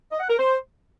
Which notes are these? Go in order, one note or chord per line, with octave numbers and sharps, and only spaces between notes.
D#5
F#5
A#4
C5